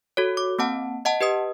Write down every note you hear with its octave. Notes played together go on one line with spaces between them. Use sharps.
F#4 A4 C#5
D6
A#3 C4 F#5 A5
D#5 F#5 A5
G4 B4 D#5 D#6